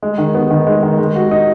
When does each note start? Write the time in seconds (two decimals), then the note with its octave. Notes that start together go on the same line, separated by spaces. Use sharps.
0.03 G#3
0.18 D#3
0.34 B3
0.51 D#3
0.67 G#3
0.83 D#3
0.98 G#3
1.15 F#4
1.31 D#4